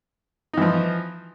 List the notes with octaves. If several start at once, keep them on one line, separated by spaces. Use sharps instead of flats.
E3 F3 D#4